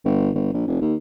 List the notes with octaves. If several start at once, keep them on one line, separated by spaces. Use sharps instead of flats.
G1
G1
A#1
F1
D#2